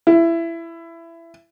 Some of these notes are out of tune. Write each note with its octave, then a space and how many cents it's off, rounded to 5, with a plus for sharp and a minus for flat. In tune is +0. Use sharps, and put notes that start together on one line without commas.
E4 +20